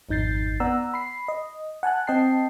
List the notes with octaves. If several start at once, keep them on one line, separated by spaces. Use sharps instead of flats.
G#1 F2 D#4 G6 A6 C7
B3 D5 F#5 A#5 E6
B5 C7
D#5
F#5 G#5 A5 F#6
C4 D#5 G5 A5 C7